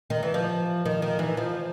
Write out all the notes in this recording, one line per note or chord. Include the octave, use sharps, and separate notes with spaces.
D#3
E3
F3
D#3
D#3
E3
F3